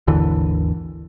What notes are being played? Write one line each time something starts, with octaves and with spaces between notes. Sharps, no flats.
G#1 D#2 D3 E3